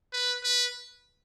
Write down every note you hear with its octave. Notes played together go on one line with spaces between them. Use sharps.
B4
B4